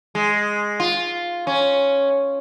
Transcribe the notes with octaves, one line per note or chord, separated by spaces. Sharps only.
G#3
F4
C#4